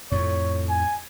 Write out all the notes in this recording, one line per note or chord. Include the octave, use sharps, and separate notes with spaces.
F2 A2 C#5
G#5